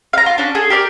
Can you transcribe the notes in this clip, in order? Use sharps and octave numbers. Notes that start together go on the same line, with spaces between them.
F5 A#5
F4
C#4 D4
G#4 A4
G4 A#4 D5